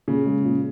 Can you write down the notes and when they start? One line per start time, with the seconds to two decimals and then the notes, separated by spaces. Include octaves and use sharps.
0.08 A#2 C#3
0.26 G#3
0.45 A#2